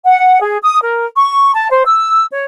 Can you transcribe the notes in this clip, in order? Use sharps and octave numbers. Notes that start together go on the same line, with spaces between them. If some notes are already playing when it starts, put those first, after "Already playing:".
F#5
G#4
D#6
A#4
C#6
A5
C5
E6
C#5